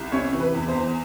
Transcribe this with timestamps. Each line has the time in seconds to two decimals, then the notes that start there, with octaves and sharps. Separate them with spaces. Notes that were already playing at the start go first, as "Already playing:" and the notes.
Already playing: C2
0.12 C3 C#4 C#5
0.33 E3
0.40 B4
0.55 E2
0.68 C5
0.75 E2